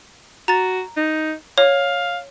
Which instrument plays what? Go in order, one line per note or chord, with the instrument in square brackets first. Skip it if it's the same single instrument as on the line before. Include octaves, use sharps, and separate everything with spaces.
[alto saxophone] F#4 [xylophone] A#5 A6
[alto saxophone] D#4
[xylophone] C#5 [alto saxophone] F5